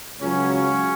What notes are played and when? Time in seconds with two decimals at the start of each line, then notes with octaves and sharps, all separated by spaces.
0.19 C#2 C#3 F#3 C#4
0.51 C#4